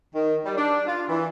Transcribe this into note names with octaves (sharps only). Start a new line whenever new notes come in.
D#3
G3
D4
F4
E3